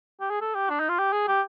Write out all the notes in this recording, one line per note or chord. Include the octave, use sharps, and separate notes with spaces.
G4
G#4
A4
G4
D4
D#4
F4
G4
G#4
G4